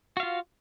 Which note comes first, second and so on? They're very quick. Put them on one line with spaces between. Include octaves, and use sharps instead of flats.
F#4 F5 F4